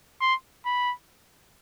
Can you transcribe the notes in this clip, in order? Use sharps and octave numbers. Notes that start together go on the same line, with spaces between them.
C6
B5